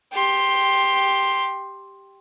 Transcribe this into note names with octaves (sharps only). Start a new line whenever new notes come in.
G4 C6